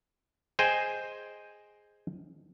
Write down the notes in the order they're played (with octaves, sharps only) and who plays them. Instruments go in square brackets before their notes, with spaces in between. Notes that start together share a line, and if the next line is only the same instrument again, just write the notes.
[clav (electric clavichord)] G#4 C5 D#5 G5 G#5